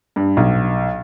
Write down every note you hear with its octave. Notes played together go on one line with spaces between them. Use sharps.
G2
B1